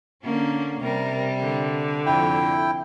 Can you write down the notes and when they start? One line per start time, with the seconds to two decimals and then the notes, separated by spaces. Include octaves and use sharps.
0.22 D3 A#3 C#4
0.81 C3 G3 A#4
1.41 D3
2.06 F2 E4 G5